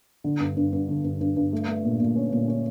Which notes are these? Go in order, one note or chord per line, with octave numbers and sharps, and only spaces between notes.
D3
G2
G2
G2
D3
G2
G2
G2
A3
A3
A#2
A#2
C#4
A#2
C#4